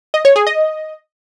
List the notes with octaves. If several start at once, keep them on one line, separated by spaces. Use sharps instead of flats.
D#5
C#5
G#4
D#5